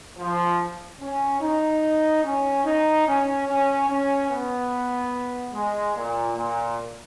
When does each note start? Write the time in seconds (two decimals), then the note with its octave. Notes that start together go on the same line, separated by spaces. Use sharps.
0.18 F3
1.01 C#4
1.41 D#4
2.23 C#4
2.65 D#4
3.06 C#4
3.47 C#4
3.89 C#4
4.30 B3
5.53 G#3
5.95 A#2
6.35 A#2